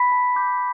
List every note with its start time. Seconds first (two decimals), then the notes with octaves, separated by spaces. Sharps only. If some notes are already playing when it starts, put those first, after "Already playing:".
Already playing: B5 B6
0.12 A5
0.36 D6 G6